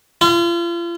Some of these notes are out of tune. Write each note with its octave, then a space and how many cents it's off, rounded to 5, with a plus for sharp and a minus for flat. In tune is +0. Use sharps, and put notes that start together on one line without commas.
F4 -40